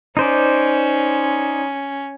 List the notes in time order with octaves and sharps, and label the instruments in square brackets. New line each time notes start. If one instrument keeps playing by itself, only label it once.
[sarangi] C#4 [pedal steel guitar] D#4 C5 D5